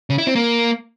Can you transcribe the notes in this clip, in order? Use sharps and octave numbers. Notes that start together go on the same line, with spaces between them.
C#3
E4
C4
A#3